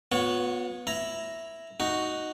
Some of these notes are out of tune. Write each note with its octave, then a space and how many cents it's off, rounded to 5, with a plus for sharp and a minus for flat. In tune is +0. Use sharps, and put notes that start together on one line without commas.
B3 +0 F4 +45 C#5 +0
E4 +0 A#5 +0
D#4 +0 F#4 +0